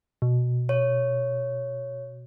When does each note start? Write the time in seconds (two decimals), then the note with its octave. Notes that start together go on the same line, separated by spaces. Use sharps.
0.22 B2
0.69 C#5